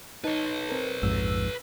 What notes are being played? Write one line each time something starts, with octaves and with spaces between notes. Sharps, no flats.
D#4 B4 C#5 A5
C4 A#4
A#1 F2 G#2 E6